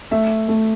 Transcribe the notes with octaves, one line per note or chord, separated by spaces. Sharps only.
A3 E5
A3